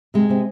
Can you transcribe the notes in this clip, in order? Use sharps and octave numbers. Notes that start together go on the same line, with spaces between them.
C3 G#3
C3 C4